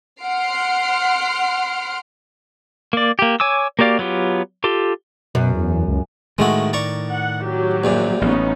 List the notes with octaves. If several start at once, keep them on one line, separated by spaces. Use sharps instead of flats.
F#5 C6 F6 C7 D7
A#3 D5
A#3 G4
C#5 G#5 D6 E6
A#3 F#4 G4 D5 F5
F#3 B3 F4 G4
F4 G4 A4
F#2 B2
E2
C#2
A2 D#3 G#3 A3 F#4
D5 A#5 C#6
F#5
F#3 G4
A#1 F#2 A#2
A1 B3 C#4 D#4